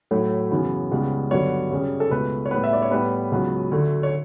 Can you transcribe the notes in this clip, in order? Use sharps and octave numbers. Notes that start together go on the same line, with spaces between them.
A2 F#3 A3
F#2 C#3 E3 B3
C#2 C#3 G3 B3
G2 D3 F#3 B3 C#5
F#2 C#3 G3
A4
C#2 B2 A3 B4
C#5
A2 G3 B3 B4
E5
D5
C#5
A2 G3 B3 B4
C#2 C#3 F#3 B3
D2 D3 A3
C#5